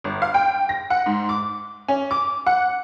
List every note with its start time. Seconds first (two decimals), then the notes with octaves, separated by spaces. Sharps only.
0.04 G1
0.22 F5
0.34 G5
0.69 A#6
0.90 F#5
1.06 G#2
1.29 D6
1.88 C#4
2.11 D6
2.47 F#5